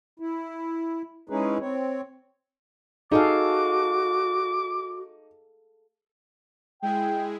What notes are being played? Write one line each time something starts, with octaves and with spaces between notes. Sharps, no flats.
E4
G#3 C#4 D#4 E4 G#4 B4
C4 C#5
D#4 F#4 G#4 A4 F5 D6
G#3 E4 G#4 G5